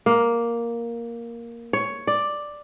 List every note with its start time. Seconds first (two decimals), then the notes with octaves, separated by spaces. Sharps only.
0.06 A#3
1.73 C#5
2.07 D5